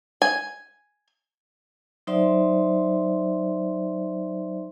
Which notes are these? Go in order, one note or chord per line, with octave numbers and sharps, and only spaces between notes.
G#5
F#3 D#4 C5 D5 E5 C6